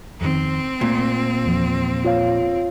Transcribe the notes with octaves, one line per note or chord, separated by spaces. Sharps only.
F2 D#3 C4
A#2 A3
E2 F3
F4 C#5 F5